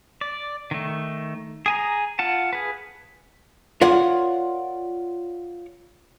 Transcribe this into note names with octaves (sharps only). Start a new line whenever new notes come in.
D5
D#3 A3
G#4 G#5 A#5
F4 F#5 A5
G#4 B4
F4 A#4 C#5 D5 F#5